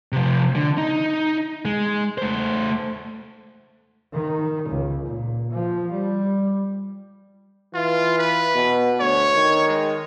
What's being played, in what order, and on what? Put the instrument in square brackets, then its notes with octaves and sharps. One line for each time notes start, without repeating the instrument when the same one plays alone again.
[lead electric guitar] C3 F3
D3
D#4
G#3
A3 C5
[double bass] D#3
C#2
A#2
F3
G3
[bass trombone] E3 [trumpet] F4
[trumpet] B4
[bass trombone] B2
[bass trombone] D2 [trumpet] C#5
[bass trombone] D#3
[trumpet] G#3